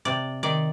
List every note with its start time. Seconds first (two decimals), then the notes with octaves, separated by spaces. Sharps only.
0.05 C3 D5
0.43 D#3 D5